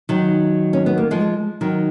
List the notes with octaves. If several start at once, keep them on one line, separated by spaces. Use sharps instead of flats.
D#3 F#3
C#4
B3
A#3
F3 G#3
D#3 F#3